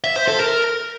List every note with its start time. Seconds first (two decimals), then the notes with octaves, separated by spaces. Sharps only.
0.04 E5
0.16 C5
0.28 A4
0.40 A#4